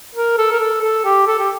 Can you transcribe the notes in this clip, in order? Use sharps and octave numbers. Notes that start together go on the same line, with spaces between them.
A#4
A4
A#4
A4
A4
G4
A4
G4